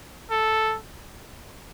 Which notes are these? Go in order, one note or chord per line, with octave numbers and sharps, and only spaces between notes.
A4